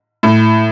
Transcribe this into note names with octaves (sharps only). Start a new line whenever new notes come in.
A2